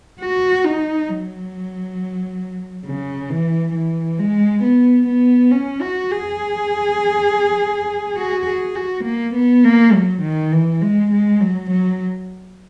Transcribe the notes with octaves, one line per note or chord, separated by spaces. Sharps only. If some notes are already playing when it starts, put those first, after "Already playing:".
F#4
D#4
F#3
C#3
E3
E3
G#3
B3
B3
C#4
F#4
G#4
F#4
G#4
F#4
A#3
B3
A#3
F#3
D#3
E3
G#3
G#3
F#3
F#3